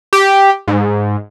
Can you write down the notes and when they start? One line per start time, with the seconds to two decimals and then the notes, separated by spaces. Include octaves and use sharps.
0.13 G4
0.68 G#2